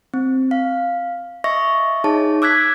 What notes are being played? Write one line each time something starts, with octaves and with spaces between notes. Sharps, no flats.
C4
F5
D#5 E5 C#6 A#6
D#4 G#4 C#5 A5
D6 E6 F#6 G#6 B6